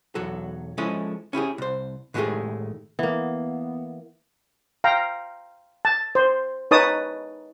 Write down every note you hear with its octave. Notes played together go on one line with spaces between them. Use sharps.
B1 E2 F#3 A4
F3 G#3 C#4 E4 A4 D#5
C#4 E4 G4 G#4
C2 C5
A2 D#3 G#3 A3 G4 G#4
E3 A#3 B3
F5 G5 A#5
A5
C5
D#4 B4 C#5 A5 D#6